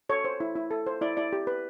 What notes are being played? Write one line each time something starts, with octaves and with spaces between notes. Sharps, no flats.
A4 C#5
C5
E4
E4
A4
C5
E4 D5
E4 D5
G4
B4